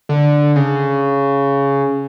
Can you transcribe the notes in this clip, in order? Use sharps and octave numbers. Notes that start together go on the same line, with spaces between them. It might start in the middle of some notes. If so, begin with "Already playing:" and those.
D3
C#3